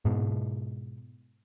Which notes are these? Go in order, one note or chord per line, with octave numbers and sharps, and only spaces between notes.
G#2 B2